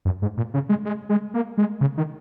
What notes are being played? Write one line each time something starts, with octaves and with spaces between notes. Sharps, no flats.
F#2
G#2
A#2
C#3
G#3
G#3
G#3
A#3
G#3
C#3
D#3